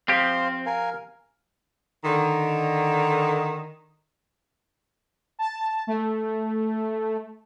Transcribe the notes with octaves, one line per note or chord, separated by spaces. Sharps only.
F3 C4 G4 C5 F5
A#4 F5 G#5
D3 D#3
A5
A3